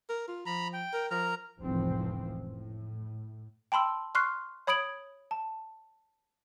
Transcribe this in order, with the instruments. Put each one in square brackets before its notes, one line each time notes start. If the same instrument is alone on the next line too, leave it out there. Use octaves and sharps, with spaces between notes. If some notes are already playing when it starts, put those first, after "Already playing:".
[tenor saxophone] A#4
F4
[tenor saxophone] F3 [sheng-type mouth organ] A#5 B5
[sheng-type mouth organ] G5
[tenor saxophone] A#4
[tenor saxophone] F3 [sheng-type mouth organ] A#4 A#5
[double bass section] F1 C#2 A2 E3 F3 C4
A2
[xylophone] G5 A5 B5 C6 E6
C6 C#6 F6 F#6 C7
C#5 B5 D#6 G#6 D7 F#7
A5